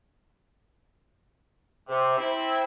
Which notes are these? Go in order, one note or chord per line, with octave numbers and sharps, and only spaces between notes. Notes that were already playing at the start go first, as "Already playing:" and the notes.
C3
C4 E4